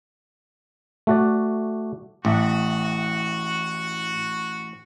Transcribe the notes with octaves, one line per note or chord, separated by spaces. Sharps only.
A3 F#4 D5
A1 A2 F#4